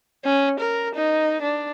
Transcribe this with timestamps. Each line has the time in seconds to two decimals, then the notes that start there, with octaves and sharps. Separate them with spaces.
0.25 C#4
0.60 A#4
0.95 D#4
1.42 D4